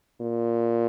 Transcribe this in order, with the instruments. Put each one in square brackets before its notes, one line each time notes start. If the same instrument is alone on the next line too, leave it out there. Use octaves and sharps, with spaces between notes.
[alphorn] A#2